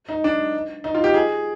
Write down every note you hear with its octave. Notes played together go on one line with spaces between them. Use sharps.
D#4
D4
D#4
F4
G4
G#4